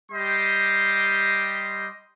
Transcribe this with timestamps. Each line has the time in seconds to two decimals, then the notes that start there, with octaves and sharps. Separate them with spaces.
0.11 G3 G4 D#5 C6